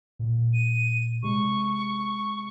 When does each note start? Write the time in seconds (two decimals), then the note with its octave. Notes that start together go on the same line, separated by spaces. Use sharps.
0.19 A#2
0.54 D#7
1.23 C3 G#3 C#6